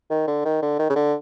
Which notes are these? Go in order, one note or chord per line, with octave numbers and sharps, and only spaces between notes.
D#3
D3
D#3
D3
D#3
C#3
D3